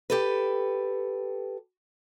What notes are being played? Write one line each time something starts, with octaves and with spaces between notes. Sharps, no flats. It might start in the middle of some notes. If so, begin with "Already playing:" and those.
G4 A4 B4